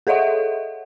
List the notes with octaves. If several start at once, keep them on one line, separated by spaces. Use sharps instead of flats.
G#4 A4 C#5 D#5 E5 F#5